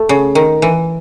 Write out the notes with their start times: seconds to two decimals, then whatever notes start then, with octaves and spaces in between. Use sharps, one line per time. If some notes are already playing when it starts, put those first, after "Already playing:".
Already playing: A3
0.09 C#3
0.35 D#3
0.62 E3